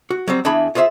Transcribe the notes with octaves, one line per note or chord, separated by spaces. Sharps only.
F#4
F#3 G3 C4
E2 D4 G#4 E5 B5
F4 G#4 C5 C#5 E5